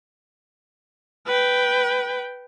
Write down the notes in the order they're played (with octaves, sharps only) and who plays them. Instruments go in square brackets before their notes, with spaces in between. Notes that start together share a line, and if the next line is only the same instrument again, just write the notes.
[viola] B4 G5